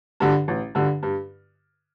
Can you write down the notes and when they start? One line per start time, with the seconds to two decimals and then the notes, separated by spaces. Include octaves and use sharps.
0.20 G2 D3
0.48 A1
0.75 G2 D3
1.03 G2